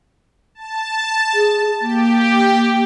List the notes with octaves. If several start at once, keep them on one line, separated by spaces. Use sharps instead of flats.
A5
G#4
A#3 G4